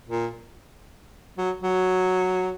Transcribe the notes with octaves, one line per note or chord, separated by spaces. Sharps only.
A#2
F#3
F#3